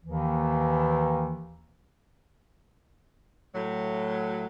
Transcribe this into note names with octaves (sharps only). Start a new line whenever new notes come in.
D#2 D#3 E3
A2 F#3